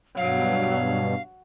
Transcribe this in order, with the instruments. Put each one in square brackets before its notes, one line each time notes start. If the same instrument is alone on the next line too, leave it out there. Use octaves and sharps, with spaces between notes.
[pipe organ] G2 B2 [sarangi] F#3 [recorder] F5